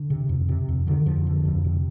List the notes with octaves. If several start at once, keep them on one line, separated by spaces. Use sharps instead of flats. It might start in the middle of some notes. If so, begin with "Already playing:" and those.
Already playing: D3
C3
F2
C3
F2
D3 D#3
F2 F3
D3
F2
C3